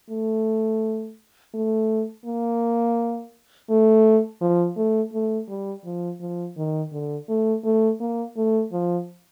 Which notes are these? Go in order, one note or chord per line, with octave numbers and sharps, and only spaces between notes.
A3
A3
A#3
A3
F3
A3
A3
G3
F3
F3
D#3
D3
A3
A3
A#3
A3
F3